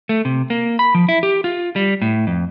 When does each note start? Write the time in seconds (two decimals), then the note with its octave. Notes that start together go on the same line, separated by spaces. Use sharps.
0.09 A3
0.25 C3
0.50 A#3
0.79 B5
0.95 F3
1.09 E4
1.23 G4
1.44 F4
1.76 G3
2.02 A2
2.27 F2